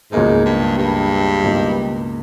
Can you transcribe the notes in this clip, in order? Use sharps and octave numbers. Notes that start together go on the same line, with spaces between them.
C#2 G#2 B2 A#3 D#4 G#4
G2
G2
C#2 B2 A#3 D#4